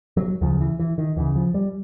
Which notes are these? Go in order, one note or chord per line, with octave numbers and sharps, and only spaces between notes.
F#3
D2 C#3 F3
E3
E3
D#3
D2 C#3 E3
F3
G3